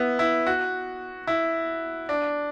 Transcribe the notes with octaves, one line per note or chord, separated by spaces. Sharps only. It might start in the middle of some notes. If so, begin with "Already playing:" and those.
Already playing: B3 E4
E4
F#4
E4
D4